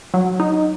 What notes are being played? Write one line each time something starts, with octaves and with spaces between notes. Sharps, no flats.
F#3
D#4